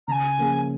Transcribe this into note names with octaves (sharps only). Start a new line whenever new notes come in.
C#3 G#5 A#5
F3 A#3 C#4 G#4